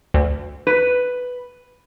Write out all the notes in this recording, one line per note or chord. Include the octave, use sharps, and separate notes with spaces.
D2
B4